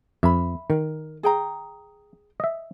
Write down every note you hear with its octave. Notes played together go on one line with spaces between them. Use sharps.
F2 E5 B5
D#3 A#4
G#4 G5 A#5
D#5 E5